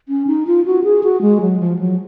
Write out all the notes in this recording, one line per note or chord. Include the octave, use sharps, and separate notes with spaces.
C#4
D#4
F4
F#4
G#4
F#4
G#3
F#3
F3
F#3